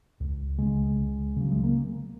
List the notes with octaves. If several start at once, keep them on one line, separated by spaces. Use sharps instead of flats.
C#2
C#3 G#3
C#2
C#3 F#3
G#3
A#3